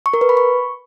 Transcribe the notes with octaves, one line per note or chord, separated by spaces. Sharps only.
C#6
A#4
B4
B5
C#6